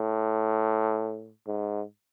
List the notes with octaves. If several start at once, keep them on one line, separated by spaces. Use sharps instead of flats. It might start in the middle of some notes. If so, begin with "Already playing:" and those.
Already playing: A2
G#2